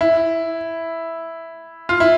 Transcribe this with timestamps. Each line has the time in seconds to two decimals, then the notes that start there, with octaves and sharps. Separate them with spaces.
0.01 E4
1.89 F4
2.00 E4